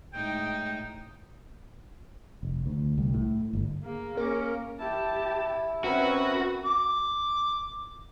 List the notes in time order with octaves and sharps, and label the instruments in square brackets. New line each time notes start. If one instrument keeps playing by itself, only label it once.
[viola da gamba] A2 G#3 D#4 [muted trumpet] G5
[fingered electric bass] F1
D2
C2
A2
G1
[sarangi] A#3 [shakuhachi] G#4
[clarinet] A#3 [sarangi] C#4 [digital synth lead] A#4
[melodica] E4 [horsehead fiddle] G4 A5
[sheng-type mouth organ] C4 A#4 E5 [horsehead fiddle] C#4 B4 [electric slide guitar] F#4
[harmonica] D6